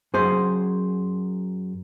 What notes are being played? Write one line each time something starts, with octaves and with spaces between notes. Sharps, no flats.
F#2 G#4 C5